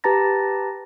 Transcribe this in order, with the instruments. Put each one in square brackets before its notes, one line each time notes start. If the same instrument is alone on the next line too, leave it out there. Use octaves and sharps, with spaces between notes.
[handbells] G4 B4 A5 A#5 A6 A#6